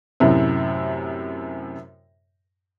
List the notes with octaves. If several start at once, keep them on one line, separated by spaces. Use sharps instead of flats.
F#2 A2 C3